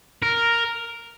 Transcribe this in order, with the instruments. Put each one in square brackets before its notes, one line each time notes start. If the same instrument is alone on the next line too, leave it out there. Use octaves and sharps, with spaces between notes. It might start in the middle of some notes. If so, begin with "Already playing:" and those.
[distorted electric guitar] A#4